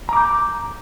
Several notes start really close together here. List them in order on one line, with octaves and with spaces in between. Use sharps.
A#5 D6 G6